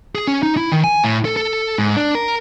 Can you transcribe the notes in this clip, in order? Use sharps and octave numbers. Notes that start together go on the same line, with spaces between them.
G#4
C#4
D#4
E4
D#3
G#5
A2
A4
A4
G#2
D4
A#4